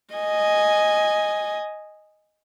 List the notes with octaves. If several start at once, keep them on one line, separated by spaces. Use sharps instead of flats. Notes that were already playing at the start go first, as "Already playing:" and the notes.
D#5 G#5